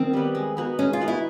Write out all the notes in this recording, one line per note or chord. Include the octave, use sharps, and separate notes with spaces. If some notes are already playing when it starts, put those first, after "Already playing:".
Already playing: D#3 C4
G3 B3
G#3
B3 D#4 F#4
G#3 C#4
F4
B3 D#4 F#4
E4